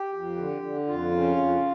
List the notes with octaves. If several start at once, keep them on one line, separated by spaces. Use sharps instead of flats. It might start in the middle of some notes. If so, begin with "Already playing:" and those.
Already playing: G4
F2
D3
D3
F2 F4
C#3
F2